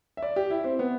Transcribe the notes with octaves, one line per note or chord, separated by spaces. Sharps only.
E5
D5
G4
E4
C4
B3